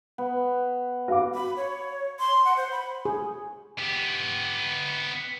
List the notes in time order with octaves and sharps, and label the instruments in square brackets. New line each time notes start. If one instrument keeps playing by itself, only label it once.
[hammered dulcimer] B3
[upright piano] F#4 F5 D6
[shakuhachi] B5
C#5
C6
F#5
C5
B5
[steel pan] G#4
[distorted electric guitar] B3 G4